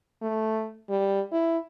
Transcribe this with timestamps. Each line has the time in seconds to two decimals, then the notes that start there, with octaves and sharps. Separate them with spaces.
0.22 A3
0.89 G3
1.32 E4